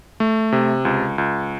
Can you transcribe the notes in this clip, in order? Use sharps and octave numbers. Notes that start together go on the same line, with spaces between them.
A3
C3
C#2
C#2